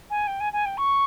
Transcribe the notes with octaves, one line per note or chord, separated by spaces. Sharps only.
G#5
G5
G#5
G#5
G5
C#6